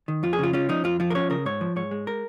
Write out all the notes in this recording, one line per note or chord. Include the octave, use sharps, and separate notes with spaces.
D#3
F2 F4
G#4
C#3 F4
C#4 F4
F3 D#4
F2 F4
F3 F4
A#4
C#4 C#5
C#3 A#4
G#2 C#5
F3
G#2 C#5
G#3
A#4